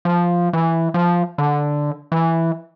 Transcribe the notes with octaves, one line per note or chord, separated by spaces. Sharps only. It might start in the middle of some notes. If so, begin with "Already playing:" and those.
F3
E3
F3
D3
E3